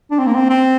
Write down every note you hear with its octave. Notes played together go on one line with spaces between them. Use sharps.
D4
C4
A#3
C4
C4